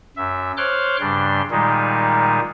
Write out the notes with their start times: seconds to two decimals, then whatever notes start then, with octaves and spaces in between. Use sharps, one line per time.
0.17 F#2 E5
0.57 C5 C#5 C6 D6 F6 F#6
1.00 G2 C#3 G3 D4 C6
1.51 A#2 D#3 G3 G#3 D#4